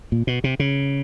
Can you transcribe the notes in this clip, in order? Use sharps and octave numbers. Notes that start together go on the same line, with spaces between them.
A#2
B2
C3
C#3